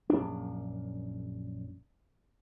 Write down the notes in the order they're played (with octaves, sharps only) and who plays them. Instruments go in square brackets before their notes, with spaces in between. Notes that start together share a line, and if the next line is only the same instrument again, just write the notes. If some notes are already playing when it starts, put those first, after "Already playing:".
[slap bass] A#1 F#2 D4